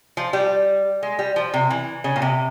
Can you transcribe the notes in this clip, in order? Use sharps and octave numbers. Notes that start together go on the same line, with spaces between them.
F3
G3
G#3
G3
F3
C3
E3
C#3
A#2
C3